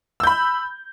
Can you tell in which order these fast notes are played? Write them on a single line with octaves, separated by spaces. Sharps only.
E6 G6 B5